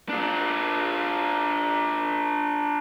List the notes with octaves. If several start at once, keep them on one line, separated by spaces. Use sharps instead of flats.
D4 F4